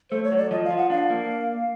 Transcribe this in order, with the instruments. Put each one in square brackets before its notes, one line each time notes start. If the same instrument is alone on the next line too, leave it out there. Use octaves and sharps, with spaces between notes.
[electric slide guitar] A3 [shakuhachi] C5
[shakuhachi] C#5
[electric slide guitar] F#3
[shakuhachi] D5
[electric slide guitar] F3 [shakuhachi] D#5
[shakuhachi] F5
[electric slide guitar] F3
[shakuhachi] F#5
[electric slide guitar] D4 [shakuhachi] F5
[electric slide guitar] A#3